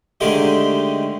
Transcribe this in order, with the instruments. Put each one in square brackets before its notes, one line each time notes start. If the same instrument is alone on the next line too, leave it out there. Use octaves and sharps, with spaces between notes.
[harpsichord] D3 D#3 G#3 A3 G4